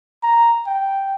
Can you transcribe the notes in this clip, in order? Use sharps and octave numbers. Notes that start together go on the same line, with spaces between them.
A#5
G5